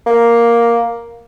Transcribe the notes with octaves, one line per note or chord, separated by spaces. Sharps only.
A#3